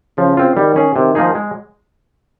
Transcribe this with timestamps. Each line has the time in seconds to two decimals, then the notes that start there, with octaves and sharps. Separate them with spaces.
0.17 C#3 F3
0.37 C4 F4
0.57 D#3 G3
0.76 C#4 G#4
0.96 C3 D#3
1.15 F3 A#3 D#4 G#4
1.35 G#3